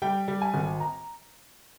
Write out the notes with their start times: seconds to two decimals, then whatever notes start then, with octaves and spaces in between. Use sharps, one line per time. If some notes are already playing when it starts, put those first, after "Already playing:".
0.02 G3 G5
0.28 G3
0.42 G#5
0.54 G#1
0.80 A#5